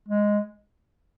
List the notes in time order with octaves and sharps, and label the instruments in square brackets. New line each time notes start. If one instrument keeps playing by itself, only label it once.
[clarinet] G#3